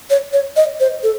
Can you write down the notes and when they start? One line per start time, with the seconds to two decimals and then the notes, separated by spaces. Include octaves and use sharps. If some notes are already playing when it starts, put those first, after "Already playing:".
0.10 C#5
0.33 C#5
0.56 D#5
0.80 C5
1.03 A4